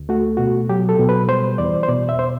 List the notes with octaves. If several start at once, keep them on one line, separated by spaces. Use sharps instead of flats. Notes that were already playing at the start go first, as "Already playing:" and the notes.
Already playing: D2
A3 F#4
B2 F#4
F#3 G4
A4
B2
B4
G3 C5
E2 D5
C5
B2 D5
E5
C5